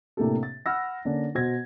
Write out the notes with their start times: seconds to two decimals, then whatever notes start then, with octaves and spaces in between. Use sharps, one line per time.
0.17 A2 C3 A#3 D4 G4 A4
0.43 A6
0.66 F#5 B5 E6 F6 A#6
1.05 D3 A#3 C#4 D4
1.35 B2 C5 G#6 A#6